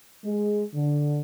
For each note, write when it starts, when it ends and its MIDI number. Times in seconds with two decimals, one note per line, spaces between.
0.25 0.63 56
0.74 1.20 50